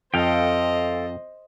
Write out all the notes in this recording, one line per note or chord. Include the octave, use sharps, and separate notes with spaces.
F2 A4 C5 D#5 F5 G5